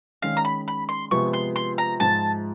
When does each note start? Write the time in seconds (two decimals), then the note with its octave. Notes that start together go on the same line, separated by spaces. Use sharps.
0.22 D#3 G#3 C#4 F5
0.37 A#5
0.45 B5
0.68 B5
0.89 C6
1.11 C3 F3 G#3 B3 C#6
1.33 C6
1.56 C6
1.78 A#5
2.00 G#2 F3 G#3 A5